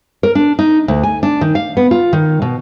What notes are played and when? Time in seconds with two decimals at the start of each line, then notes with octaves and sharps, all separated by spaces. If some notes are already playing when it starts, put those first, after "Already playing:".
0.23 A#4
0.35 D4
0.59 D#4
0.88 D2
1.03 G#5
1.23 D4
1.41 D#3
1.55 F5
1.77 B3
1.91 F4
2.13 D#3
2.42 B2